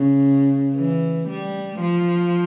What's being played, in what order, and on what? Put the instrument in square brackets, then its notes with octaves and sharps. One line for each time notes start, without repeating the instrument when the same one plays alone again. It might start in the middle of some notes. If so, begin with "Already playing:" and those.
Already playing: [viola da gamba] C#3
E3
G3
F3